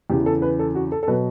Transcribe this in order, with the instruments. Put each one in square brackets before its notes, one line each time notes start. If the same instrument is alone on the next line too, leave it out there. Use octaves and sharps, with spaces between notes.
[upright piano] E2 C#3 E3 G4
A4
B4
A4
F#4
A4
A4
B2 F#3 B4